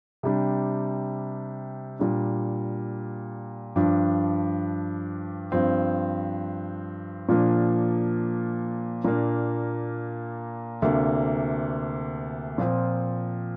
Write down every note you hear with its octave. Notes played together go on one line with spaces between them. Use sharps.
C3 G3 D4
A#2 G3 D4
G2 F3 D4
G2 F3 C4
A#2 F3 A#3 D4
A#2 A#3 D4
D2 C3 A#3 D4
A#2 F3 C4